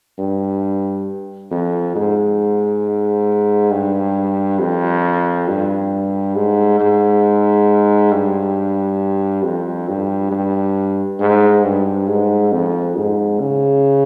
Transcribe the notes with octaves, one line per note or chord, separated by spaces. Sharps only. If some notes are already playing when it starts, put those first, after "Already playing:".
G2
F2
G#2
G2
F2
G2
G#2
G#2
G2
F2
G2
G2
G#2
G2
G#2
F2
G#2
C#3